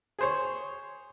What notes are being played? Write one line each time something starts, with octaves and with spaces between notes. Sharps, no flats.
G#4 C5 C#5